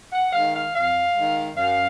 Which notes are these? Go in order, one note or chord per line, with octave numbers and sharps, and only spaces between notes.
F#5
D#3 G#3 F5
F5
F2 F5
D#3 G#3
F#2 F5